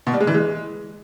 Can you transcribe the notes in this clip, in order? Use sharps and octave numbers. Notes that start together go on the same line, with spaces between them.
B2
G3
G#3
E3
G#3